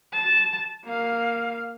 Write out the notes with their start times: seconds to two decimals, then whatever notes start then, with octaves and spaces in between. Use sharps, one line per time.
0.13 A5
0.85 A#3 F5